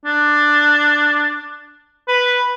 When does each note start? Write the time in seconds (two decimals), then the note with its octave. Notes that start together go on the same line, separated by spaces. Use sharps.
0.05 D4
2.08 B4